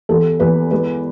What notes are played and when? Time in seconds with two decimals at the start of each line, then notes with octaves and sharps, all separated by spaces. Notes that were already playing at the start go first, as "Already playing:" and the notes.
0.09 E2 A4
0.40 E2 B4
0.71 G#3 B4